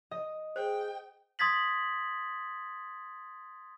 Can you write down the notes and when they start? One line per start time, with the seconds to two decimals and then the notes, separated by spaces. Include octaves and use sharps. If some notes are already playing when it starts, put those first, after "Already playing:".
0.11 D#5
0.56 G#4 C5 G5
1.39 C6 D#6 G#6 A6 B6 F#7